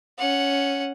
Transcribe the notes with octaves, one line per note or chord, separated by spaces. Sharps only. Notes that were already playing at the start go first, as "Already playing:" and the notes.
C#4 F#5